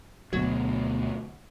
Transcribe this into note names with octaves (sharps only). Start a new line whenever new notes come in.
D2 B2 F#3